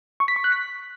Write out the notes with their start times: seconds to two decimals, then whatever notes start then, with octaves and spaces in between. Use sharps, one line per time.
0.20 C#6
0.28 B6
0.36 C#6
0.44 F#6
0.52 B6